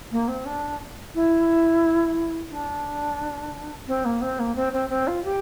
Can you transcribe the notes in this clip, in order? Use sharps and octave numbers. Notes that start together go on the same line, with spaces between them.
A#3
C4
D4
E4
D4
C4
A#3
C4
A#3
C4
C4
C4
F4
G4